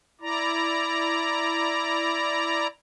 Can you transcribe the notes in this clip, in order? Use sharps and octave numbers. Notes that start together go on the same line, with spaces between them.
E4 D5 A#5